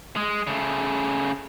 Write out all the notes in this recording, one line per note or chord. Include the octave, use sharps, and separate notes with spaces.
G#3
C#3 A3